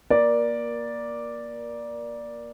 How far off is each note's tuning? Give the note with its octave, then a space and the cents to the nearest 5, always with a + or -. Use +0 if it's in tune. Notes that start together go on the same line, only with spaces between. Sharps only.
A#3 +15 A#4 +25 D5 +0